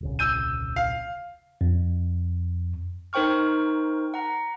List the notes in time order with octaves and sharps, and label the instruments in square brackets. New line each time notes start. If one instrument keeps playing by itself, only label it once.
[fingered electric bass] D#1 C2 C#3
[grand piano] E6 G6 D#7
F5
[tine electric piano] F2
[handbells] D#4 A#4 C5 G5 C#6 F6
F#5 A#5